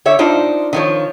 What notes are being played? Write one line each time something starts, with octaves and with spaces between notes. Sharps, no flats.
D3 C#5 E5
D4 D#4 F4 C5
D#3 F3 C#5